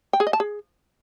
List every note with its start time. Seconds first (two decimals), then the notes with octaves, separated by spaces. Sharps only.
0.13 G5
0.20 G#4
0.27 D#5
0.33 A5
0.40 G#4